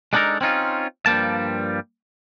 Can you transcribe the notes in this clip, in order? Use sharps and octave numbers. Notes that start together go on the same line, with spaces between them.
G#3 B3 D4 D#4 A4 A#4
C4 C#4 D#4 F4
G2 F3 G3 A#3 A5